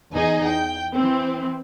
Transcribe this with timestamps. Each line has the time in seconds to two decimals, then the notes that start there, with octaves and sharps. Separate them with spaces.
0.13 E2 D#4 G#4 D#5 G#5
0.48 G5
0.95 E3 C4